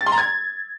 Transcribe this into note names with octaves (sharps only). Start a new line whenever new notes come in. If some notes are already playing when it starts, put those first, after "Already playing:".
A6
C6
A#5
G#6